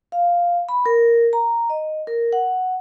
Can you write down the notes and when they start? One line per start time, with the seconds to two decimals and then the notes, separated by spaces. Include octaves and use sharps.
0.12 F5
0.69 B5
0.86 A#4
1.33 A#5
1.70 D#5
2.07 A#4
2.33 F#5